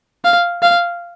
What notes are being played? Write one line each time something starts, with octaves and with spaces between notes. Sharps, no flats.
F5
F5